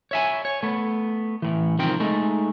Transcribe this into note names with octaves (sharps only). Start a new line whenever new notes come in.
C#5 E5 G#5
C#5
A3 B3
A2 E3
C2 D#3 F3 C4 G5
G#3 A3 D#4